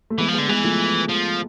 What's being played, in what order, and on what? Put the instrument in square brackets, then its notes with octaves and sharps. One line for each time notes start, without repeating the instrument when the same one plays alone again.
[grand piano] A3
[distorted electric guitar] E3 [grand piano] G#3 B3
[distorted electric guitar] F3
[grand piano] G#3 B3
[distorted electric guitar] D3
[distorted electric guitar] E3 [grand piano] G#3 B3
[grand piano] F3 A3
[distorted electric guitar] F3